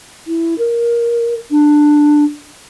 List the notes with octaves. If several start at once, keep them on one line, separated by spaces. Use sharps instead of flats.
E4
A#4
D4